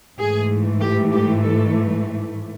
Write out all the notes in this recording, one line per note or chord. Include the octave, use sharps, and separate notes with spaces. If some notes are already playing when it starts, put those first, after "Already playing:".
G#2 E3 A3 G#4
G4
G4
A4